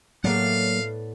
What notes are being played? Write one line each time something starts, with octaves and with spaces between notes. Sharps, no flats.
A2 F#3 A#3 B3 D5 F5